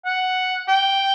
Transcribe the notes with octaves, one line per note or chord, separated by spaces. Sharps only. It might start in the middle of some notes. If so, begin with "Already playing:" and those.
F#5
G5